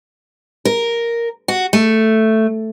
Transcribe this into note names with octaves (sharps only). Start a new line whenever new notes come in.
A#4
F#4
A3